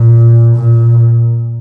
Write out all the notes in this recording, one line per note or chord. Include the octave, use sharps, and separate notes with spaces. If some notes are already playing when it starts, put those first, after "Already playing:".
Already playing: A#2
A#2